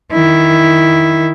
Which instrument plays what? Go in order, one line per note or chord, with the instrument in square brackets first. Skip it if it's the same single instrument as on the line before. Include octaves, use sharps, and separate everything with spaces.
[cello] D#3 E4